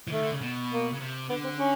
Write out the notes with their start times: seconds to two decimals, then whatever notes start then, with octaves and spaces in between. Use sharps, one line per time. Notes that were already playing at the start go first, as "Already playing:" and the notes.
0.08 E3
0.12 D#3 A3
0.22 D3
0.32 C#3
0.41 B2
0.71 A#3
0.93 C#3
1.00 C3
1.30 D3 B3
1.44 C4
1.57 C#4